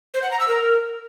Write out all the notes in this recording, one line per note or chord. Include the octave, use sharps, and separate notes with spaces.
C5
F#5
A#5
E6
A#4